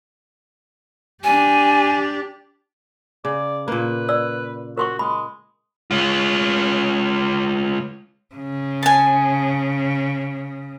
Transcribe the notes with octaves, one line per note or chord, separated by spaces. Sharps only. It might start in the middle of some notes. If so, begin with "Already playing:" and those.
D4 G4 G#5
C#3 D5
A#2 A#3 B4
D5 E6
F#4 A#4 C6 C#6
G#3 B5
G#3 F4
C#3
G#5 A5